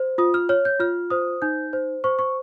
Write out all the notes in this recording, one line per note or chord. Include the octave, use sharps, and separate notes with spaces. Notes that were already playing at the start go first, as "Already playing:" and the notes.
Already playing: C5
F4 D#6
F6
C#5 F6
G6
F4 F6
C5 D#6
D#4 G6
C5
C5 C#6
C#6